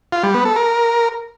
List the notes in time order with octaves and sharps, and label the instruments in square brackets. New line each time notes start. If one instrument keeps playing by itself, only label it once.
[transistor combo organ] F4
G3
B3
A4
A#4